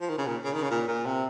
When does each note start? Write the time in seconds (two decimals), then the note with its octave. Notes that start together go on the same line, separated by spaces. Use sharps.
0.01 F3
0.09 D#3
0.18 C#3
0.27 A#2
0.44 C#3
0.53 D#3
0.63 C#3
0.71 A#2
0.88 A#2
1.06 C3